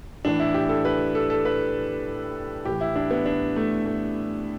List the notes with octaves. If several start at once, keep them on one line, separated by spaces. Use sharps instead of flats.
A2 E3 D4
E4
G4
A4
B4
A4
A4
B4
A2 E3 G4
E4
D4
B3
D4
A3
A3